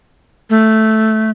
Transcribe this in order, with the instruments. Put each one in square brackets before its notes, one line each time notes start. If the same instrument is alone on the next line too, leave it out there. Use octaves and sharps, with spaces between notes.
[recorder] A3